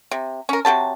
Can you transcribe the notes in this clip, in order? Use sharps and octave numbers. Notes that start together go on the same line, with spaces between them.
C3
C#4 A#4
C3 F#3 G4 A5